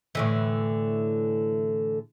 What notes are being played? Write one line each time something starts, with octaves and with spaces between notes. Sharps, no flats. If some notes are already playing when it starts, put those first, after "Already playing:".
A2 D3 E3